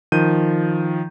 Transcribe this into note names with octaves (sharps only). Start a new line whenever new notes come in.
D#3 F3 G6 D#7